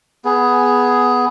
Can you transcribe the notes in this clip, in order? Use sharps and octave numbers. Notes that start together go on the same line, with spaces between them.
B3 G#4